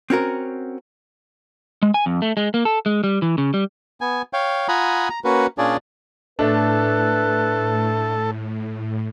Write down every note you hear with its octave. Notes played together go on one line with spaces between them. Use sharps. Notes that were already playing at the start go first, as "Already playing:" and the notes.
C4 C#4 F#4 A#4
G#3
G#5
F2
A3
G#3
A#3
A4
G#3
G3
E3
C#3
G3
B3 G#5
C#5 F5 G5
F4 F#5 G#5 A#5 B5 D#6
A#5
A#3 C#4 F#4 B4
A#2 C#4 D4 F4 G#4 D5
A2 A3 D4 A4 B4